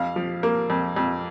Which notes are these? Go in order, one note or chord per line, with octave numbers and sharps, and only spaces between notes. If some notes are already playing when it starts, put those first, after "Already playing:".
Already playing: F2 F5
F3
A#3
F2
F2